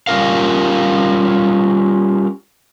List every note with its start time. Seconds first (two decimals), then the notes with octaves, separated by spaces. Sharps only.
0.07 G3 C#4 F4 A#4 F5